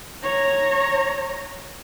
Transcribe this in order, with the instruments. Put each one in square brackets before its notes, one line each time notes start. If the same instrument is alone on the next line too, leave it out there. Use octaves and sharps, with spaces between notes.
[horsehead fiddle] C#5 A#5